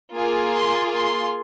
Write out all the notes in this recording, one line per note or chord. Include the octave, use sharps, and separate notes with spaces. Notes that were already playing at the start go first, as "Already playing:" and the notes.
A#3 F4 G#4
C6
C6